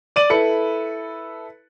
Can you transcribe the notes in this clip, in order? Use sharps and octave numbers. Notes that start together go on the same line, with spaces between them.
D5 D#7 F#7
E4 A4 B4 C#7